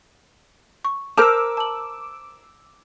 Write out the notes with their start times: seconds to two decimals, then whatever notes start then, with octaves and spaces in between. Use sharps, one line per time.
0.85 C#6
1.17 A#4 C5 A5 A#5 D6 E6 F6 G6
1.57 A5 F#7